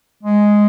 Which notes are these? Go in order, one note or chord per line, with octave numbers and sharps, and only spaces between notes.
G#3